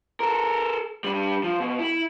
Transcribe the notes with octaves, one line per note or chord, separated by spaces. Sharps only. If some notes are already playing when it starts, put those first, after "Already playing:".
A4 A#4
G3 D4
F3
B2
E4